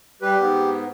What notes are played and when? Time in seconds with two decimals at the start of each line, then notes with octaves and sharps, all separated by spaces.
0.22 G3 G4 B4
0.40 G#2 B3